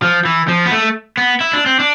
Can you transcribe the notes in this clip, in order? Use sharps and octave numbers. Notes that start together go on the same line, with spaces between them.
F3
E3
F3
B3
A3
B3
E4
D4
C4
D4